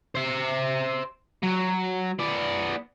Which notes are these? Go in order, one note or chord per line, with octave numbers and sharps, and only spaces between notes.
C5 E5
F#3
B3 D5